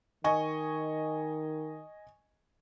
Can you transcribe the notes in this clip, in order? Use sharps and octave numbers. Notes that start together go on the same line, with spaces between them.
D#3 D#5 G#5 C#6